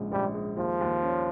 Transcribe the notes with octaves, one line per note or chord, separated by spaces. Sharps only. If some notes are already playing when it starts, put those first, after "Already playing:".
Already playing: A#1 G#2 C#3
A#1 G3
G#3
D#2 F3
D#2
C#4